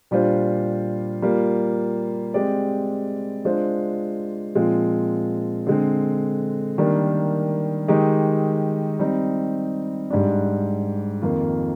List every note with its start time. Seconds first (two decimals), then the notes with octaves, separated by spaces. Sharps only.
0.11 A#2 G3 D4 F4 C5
1.22 G3 A#3 F4
2.34 G#3 C4 G4 D5
3.45 G#3 D4 F4 C5
4.55 A#2 F3 G#3 C4 F4
5.67 D3 G#3 C4
6.78 D#3 G3 A#3 D4
7.88 D#3 G#3 D#4 G4
8.99 G3 C4 D#4
10.10 G#2 G3 D4
11.22 F2 D#3 A#3 F4